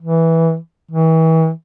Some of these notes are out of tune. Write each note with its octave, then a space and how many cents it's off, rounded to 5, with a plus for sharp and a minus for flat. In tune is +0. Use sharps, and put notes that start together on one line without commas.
E3 -10
E3 -35